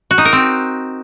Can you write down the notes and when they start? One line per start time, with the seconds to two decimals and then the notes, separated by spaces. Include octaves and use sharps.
0.11 F#4
0.18 D#4
0.25 A#4
0.33 C4